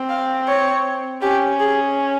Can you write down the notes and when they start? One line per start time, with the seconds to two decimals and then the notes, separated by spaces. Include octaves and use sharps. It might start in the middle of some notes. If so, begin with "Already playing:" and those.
Already playing: C4
0.09 F5
0.48 C#5
1.22 C#4 G4
1.60 G#4